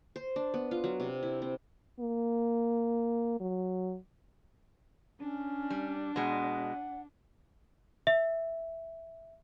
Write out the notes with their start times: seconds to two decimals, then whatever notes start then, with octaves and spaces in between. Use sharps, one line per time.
0.16 C5
0.36 D4
0.54 B3
0.71 F4
0.84 F#3
1.00 C3
1.23 E4
1.42 C4
2.00 A#3
3.40 F#3
5.20 C#4 D4
5.70 G3
6.16 B2 G#3 F#5
8.07 E5